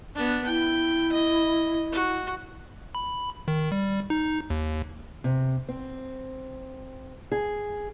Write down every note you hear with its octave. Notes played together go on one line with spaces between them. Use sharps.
B3 D4
E4 G5
D#5
F#4
B5
D#3
G3
D#4
D#2
C3
C4
G#4